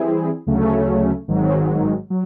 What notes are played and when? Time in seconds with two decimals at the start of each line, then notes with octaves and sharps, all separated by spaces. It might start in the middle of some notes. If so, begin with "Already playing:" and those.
Already playing: E3 G3 C4 E4 G#4
0.46 D2 C#3 F#3 A3 C#4
1.28 G#1 G#2 D#3 F#3
2.10 F#3